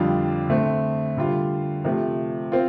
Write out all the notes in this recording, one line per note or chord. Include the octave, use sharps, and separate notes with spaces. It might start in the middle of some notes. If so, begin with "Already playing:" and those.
Already playing: F2 D3 G3 D4 F4
D3 A3 C4
D3 G3 F4
C3 F3 A3
C4 F4